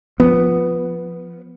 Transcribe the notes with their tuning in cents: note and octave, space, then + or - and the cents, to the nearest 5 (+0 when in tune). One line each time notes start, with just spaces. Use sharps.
F3 +0 B3 +0